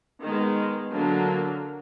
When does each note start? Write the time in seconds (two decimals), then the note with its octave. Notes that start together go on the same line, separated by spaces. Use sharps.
0.22 D#3 G#3 B3
0.93 D3 F#3 A#3